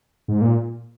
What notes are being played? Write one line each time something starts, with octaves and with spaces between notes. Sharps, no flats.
G#2
A#2